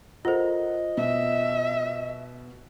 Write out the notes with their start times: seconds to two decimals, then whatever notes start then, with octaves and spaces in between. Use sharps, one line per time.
0.25 F4 A4 A#4 C5 D#5 F#5
0.97 B2 E5